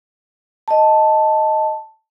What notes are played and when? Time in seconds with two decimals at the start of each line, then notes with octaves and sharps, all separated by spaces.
0.68 D#5 A5